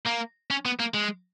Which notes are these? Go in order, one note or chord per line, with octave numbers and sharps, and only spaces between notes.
A#3
C#4
B3
A#3
G#3